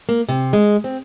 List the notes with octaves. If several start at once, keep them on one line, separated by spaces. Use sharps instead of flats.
A#3
C3
G#3
C4